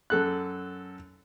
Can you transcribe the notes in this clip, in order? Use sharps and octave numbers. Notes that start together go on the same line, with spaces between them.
F#2 A4 F#6